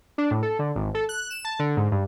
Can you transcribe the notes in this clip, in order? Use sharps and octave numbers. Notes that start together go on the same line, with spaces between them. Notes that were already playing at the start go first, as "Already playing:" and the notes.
D4
A2
A4
D3
G#1
A4
F#6
E7
A5
D3
G#2
G2